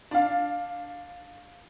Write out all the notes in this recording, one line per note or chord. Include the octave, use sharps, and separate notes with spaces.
D4 F5